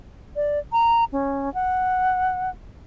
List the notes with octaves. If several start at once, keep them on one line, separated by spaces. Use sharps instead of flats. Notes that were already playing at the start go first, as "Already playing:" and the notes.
D5
A#5
C#4
F#5